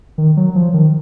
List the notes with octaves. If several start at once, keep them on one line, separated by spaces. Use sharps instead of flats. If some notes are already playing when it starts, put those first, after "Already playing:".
D#3
F#3
F3
D#3